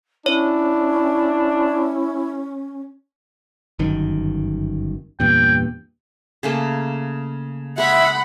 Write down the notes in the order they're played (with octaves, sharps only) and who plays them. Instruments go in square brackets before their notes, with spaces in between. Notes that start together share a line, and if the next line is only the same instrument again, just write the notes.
[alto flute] C#4 [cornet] D4 [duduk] E4 [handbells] C#5
[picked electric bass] G1 F#2 D#3
[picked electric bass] E2 G2 A#2 [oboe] G5
[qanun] C#3 A3 A#3 [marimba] G#4 G#5
[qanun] G#3 C#6 [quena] E5 [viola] F#5 B5